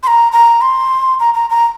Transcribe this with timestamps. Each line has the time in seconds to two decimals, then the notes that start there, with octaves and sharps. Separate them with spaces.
0.03 C6
0.07 A#5
0.32 A#5
0.61 C6
1.20 A#5
1.34 A#5
1.50 A#5